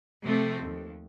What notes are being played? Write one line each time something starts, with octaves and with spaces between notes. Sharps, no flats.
C3 F3 A3 C4
D#2